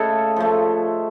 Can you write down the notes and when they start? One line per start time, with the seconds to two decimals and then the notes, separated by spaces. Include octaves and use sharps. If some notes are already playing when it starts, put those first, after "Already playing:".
Already playing: C#3 A3 A4 D#5 F5
0.36 F3 A3